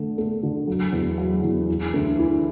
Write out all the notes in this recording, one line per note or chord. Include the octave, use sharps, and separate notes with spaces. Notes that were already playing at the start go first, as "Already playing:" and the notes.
Already playing: D3 A3
A3
D3
F#3
E2
F#3
E2
E3
D2
E3